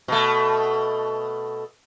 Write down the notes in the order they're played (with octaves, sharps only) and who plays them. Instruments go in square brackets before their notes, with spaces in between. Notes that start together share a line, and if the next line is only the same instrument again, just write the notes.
[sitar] B2 A3